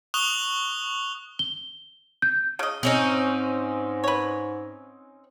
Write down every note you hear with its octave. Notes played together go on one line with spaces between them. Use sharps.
C#6 D#6 F#6 F7 G7
G7
G6
C#3 D#5
G#2 C4 C#4 D#4
B4 C#5